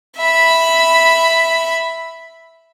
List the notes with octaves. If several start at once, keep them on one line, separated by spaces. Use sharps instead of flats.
E5 B5